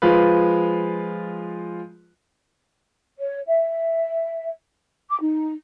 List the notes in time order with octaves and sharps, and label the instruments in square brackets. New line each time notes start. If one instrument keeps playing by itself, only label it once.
[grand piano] F3 G#3 F4 B4
[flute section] C#5
E5
D6
D#4